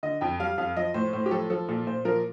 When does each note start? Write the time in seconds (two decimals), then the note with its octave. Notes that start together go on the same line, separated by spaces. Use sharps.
0.03 D3 D#5
0.21 F2 G5
0.40 G3 F5
0.58 F2 F5
0.77 F3 D#5
0.94 A2 C5
1.13 A2 C5
1.26 G4
1.31 F3 A4
1.50 F3 A4
1.68 A#2 A4
1.87 A#2 C5
2.05 F3 A#4